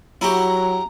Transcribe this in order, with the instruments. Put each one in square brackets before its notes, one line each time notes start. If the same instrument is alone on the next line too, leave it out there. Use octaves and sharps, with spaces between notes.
[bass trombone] F#3 [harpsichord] E4 F#4 G4 [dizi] A#5